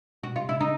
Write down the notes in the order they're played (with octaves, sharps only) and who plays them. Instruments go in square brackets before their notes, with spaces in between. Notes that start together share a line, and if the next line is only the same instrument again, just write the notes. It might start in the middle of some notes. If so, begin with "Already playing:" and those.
[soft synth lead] B2 [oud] F#4
[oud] F4
[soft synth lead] C3
[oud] E4
[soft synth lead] C#3 [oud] D#4